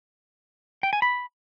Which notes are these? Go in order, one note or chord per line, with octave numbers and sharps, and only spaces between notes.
G5
G#5
B5